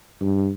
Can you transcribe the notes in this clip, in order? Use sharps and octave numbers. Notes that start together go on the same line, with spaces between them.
G2